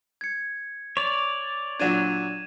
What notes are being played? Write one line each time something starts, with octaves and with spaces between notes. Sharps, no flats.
G#6 C#7
C#5 D5 F7
A#2 F#3 D4 G#6 D#7 E7